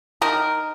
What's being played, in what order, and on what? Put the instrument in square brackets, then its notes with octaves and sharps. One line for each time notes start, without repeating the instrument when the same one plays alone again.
[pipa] D#3 A#4